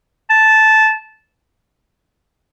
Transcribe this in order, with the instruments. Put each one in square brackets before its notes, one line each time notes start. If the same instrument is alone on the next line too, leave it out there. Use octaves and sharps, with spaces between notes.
[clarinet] A5